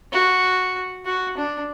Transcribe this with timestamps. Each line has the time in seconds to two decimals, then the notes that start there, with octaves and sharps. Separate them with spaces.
0.13 F#4
1.06 F#4
1.37 D4